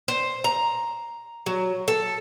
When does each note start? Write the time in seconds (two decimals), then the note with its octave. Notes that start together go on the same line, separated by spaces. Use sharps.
0.08 C5
0.44 A#5
1.46 F#3
1.88 A4